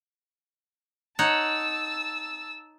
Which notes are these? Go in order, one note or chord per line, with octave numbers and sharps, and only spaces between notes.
D#4 C#5 F#5 A5 E6